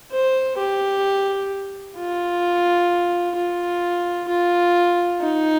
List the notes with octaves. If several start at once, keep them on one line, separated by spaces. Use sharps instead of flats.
C5
G4
F4
F4
F4
D#4